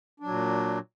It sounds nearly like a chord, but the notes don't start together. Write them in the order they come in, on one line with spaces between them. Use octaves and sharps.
D4 F#3 A#2